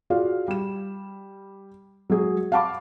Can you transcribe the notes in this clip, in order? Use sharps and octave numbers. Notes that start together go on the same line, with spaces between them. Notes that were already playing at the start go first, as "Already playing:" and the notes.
F4 F#4 G#4 D5 F5
G3 E7
F#3 G#3 G#4
F5 F#5 A5 B5 D6